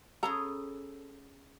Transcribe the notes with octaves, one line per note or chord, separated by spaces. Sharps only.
B3 C#4 G#4 A4 A#5